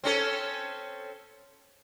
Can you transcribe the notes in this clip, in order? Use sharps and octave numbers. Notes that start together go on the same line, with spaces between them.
C4 C#4 A4